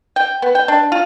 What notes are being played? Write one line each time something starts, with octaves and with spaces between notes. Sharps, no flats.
G5
B3
G5
D4
F4